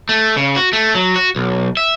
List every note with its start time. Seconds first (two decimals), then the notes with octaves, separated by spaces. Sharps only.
0.09 A3
0.37 C#3
0.56 F#4
0.73 A3
0.95 F#3
1.16 F#4
1.36 B1
1.77 E5